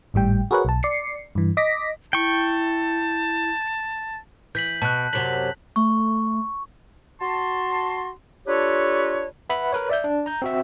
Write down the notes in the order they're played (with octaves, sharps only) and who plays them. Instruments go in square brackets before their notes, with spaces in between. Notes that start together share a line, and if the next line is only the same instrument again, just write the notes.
[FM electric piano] G#1 A2 G3 G5
F#4 G#4 A#4 B4 C#5 F#5
B1 A5
D5 C7 C#7
G2 E3
D#5 D6 A#6 B6
[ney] E4 [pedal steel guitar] G5 C#6 [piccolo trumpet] A5
[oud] E3 [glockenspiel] G6 B6 F#7
[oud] B2 [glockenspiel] A5 F#6
[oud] F#2 C3 F#3 [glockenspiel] B6 F#7
[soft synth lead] A3 [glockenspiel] C#6
[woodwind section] F#4 A5 C6
D4 F4 G4 A4 B4 C#5
[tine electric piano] B4 E5 F#5 B5
A#4 B4 C#5
D5 E5 G6
D4
A#5 G6
C4 F#4 E5